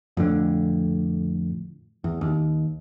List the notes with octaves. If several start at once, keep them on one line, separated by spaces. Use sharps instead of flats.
F2 A2 D3
E2
D#2